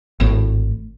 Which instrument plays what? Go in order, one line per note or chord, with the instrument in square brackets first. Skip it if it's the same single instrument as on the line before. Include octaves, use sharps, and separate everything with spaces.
[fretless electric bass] G#1 A2